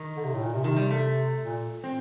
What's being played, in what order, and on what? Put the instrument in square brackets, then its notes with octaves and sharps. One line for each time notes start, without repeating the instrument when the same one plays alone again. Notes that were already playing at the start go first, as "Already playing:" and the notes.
Already playing: [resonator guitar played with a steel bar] D#3
[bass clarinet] D3
C3
A2
A#2
C3
[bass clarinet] C3 [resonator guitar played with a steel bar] D#3
[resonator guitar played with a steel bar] G3
A3
[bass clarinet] A#2
[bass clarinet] A#2 [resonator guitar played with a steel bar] C4